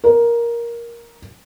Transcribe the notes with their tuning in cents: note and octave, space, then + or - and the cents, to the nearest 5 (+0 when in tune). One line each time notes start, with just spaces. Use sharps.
A#4 +10